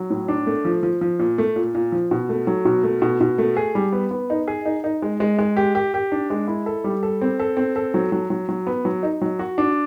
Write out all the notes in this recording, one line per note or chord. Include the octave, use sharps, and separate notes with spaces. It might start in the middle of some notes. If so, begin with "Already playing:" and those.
Already playing: F#3
A2
D4
A3
F3
F3
F3
A#2
A3
A#2
A#2
F3
B2
A3
F#3
B2
A3
B2
B2
A3
G#4
G3
B3
B3
D#4
G#4
D#4
D#4
G#3
G#3
G#3
G4
G4
G4
D4
G#3
E4
A4
G3
A4
C4
A4
C4
A4
F#3
F#3
F#3
F#3
B3
F#3
D#4
F#3
F#4
D4